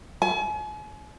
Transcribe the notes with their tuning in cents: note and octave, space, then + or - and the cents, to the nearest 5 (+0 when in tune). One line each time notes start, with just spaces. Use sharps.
G#5 +40